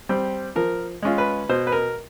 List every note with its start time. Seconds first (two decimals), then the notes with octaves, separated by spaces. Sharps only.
0.09 G3 C4
0.56 F3 A#4
1.03 G#3 C#4 F4
1.18 B4
1.49 B2 C5
1.67 B4
1.72 A#4